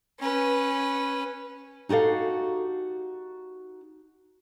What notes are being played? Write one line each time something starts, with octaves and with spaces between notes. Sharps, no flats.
C#4 B4
D#4 F#4 G4 A4 F5